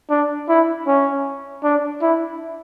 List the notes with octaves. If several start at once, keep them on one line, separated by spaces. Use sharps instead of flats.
D4
E4
C#4
D4
E4